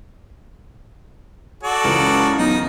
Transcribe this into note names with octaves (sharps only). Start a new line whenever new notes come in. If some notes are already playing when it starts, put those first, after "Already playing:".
F#4 A4 D5
C#2 F#2 C#3 E3
B1 D#4